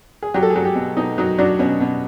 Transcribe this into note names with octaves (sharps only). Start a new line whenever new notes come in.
G#4
F#3 G4
A4
G#4
F#3
G4
B2
B2 D#4
F#3 D#4
F#3 D4
B2 C#4
B2